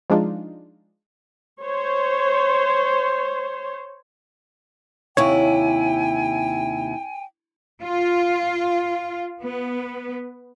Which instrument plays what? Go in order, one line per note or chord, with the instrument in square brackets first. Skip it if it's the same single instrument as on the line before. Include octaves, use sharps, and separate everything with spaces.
[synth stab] F3 G#3 D4 D#4 F4
[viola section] C5 C#5
[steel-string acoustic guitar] D#2 C3 E4 [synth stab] C#5 [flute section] G5 G#5
[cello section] F4
B3